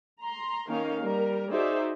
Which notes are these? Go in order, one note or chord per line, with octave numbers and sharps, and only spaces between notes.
A#5 C6
D#3 A#3 C#4 D#4 A#4 F5
G3 A#4
D#4 F#4 G#4 C5 D5 E5